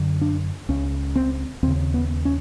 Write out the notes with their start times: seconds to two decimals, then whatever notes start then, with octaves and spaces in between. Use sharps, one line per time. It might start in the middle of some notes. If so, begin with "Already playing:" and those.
Already playing: F#2 D3
0.21 D4
0.69 C#2 C#3 C#4
1.16 C4
1.63 D#2 C4
1.67 C#3
1.94 B3
2.25 C#4